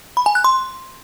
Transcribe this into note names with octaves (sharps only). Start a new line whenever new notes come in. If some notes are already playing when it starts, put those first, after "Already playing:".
B5
G#5
F#6
C6